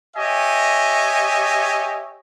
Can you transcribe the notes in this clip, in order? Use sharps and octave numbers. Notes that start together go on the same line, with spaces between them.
G4 C#5 D#5 E5 G#5